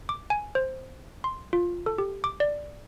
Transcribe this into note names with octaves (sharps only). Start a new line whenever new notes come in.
D6
G#5
C5
C6
F4
A4
G4
D6
D5